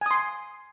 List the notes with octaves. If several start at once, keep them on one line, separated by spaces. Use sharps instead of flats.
G#5 C6 D#6